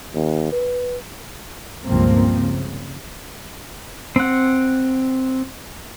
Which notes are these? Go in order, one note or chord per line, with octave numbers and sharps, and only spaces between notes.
D#2
B4
C#2 G2 A#2 F3 A#3 C4
C#3
C4 F#5